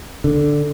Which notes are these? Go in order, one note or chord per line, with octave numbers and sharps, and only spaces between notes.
D3